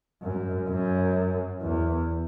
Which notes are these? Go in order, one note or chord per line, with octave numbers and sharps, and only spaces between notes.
F#2
F#2
E2